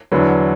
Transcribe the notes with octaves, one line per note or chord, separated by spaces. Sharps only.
E2 D3 F#3 B4